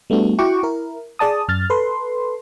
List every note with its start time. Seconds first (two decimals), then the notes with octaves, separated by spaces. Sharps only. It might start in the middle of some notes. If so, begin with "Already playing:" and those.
0.10 G3 A3 B3 D4 F#4
0.39 E4 F#4 F#5 G5 C#6 D6
0.63 E4 A#4
1.19 G#4 D5 A5 D#6
1.48 F#2 F6 A6
1.70 A4 B4 C6